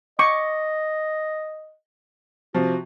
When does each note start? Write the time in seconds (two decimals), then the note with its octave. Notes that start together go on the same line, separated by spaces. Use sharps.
0.19 D#5 C#6 D6
2.55 C3 F3 F#4